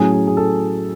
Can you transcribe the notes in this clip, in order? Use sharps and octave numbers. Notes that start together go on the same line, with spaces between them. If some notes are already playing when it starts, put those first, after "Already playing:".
Already playing: A2 F#3 C#4 G#4
G#4
G#4
A4